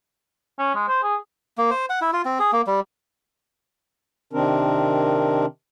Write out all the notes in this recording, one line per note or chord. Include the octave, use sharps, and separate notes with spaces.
C#4
G#3
C5
G#4
A#3
C5
F#5
E4
F4
C4
G#4
A#3
G3
C3 D#3 C4 D4 A#4